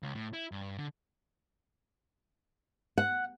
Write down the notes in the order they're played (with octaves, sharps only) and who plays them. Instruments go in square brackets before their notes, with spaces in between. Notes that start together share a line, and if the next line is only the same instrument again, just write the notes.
[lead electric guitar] C#2
A2
E4
G2
D3
[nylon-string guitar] F#5